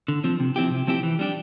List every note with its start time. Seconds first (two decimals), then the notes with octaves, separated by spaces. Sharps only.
0.08 D3
0.24 F3 C4
0.40 C3
0.56 F3 C4 E4 G4
0.71 C3
0.87 F3 C4 E4 G4
1.03 E3
1.19 G3 D4 G4